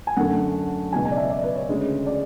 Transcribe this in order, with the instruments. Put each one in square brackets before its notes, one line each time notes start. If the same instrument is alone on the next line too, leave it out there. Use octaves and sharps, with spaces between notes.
[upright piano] G#5
F#2 D3 A3 F#5
C#2 B2 F#3 G#5
G#5
D5
E5
D5
B4
C#5
D2 C#3 G#3
D5